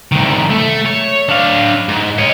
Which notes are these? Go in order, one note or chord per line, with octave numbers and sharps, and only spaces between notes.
C2 D#3
A3
C#5
D4 F5
G#2
C#5 D#5